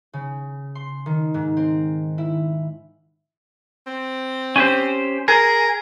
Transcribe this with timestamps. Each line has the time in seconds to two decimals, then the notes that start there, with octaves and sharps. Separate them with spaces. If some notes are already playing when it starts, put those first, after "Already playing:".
0.13 C#3
0.75 C6
1.06 D#3
1.34 G#2
1.57 C4
2.18 E4
3.87 C4
4.56 C#4 G4 C5
5.28 G#4 A#4